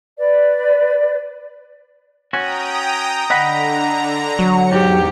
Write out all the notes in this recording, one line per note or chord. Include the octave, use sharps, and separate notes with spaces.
B4 D5
C#4 F#4 G5 A#5 D#6
D3 D#5 F#5 A#5 B5
F#3 C#7
E2 G#2 G4